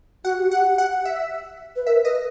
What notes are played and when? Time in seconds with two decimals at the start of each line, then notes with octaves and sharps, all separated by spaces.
0.24 F#4 F#5
0.38 G4
0.51 G4 F#5
0.78 F#5
1.05 E5
1.76 B4
1.86 A#4 E5
2.05 B4 D#5